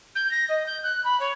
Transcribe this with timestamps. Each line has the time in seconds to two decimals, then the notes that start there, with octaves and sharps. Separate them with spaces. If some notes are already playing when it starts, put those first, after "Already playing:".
0.15 G6
0.31 A#6
0.49 D#5
0.66 G6
0.83 F#6
1.04 B5
1.20 C#5